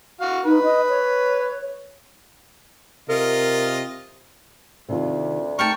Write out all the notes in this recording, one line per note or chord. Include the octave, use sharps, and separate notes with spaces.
F#4 F5
D#4 B4
D#5
C#5
C3 F4 A#4 D#5
D2 C3 D#3 F4
A3 D#4 A#4 G5 A5 C#6